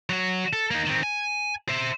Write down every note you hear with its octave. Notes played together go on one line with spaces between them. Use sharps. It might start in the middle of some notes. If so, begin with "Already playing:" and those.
F#3 F#4
A4
A#3 D#4
D#3 C4
G#5
C5 E5